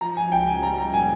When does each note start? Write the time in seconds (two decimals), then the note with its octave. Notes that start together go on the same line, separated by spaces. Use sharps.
0.01 F3 A#5
0.17 G#5
0.32 C#2 G5
0.48 G#5
0.63 G3 A#5
0.78 A#5
0.93 A#2 G#5